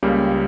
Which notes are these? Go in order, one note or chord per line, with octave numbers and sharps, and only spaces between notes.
C#2 C#3 G3 A#3